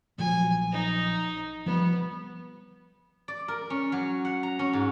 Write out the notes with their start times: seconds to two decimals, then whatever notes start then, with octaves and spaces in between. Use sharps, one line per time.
0.18 A#1 F3 F#3 G#5
0.72 D#4
1.66 F3 G3 B3
3.28 D5
3.48 A#4
3.70 C#4
3.92 F#3
4.25 F#5
4.43 A#5
4.59 C#4
4.73 G#2